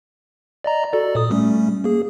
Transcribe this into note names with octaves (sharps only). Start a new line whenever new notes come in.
D5 D#5 A#5
F#4 A4 D5
A#2 D#6
G3 A3 C#4
A#3 G#4